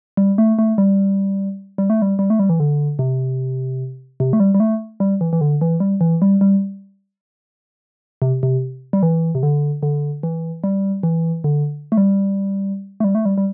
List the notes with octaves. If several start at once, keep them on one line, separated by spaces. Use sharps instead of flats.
G3
A3
A3
G3
G3
A3
G3
G3
A3
G3
E3
D3
C3
C3
A3
G3
G3
A3
G3
E3
E3
D3
E3
G3
E3
G3
G3
C3
C3
G3
E3
C3
D3
D3
E3
G3
E3
D3
A3
G3
A3
G3
A3
G3
G3